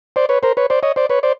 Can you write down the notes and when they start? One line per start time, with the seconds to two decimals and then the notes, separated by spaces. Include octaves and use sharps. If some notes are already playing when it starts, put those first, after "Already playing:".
0.16 C5 D5
0.29 B4 C#5
0.43 A#4 C5
0.57 B4 C#5
0.70 C5 D5
0.83 C#5 D#5
0.96 C5 D5
1.10 B4 C#5
1.23 C5 D5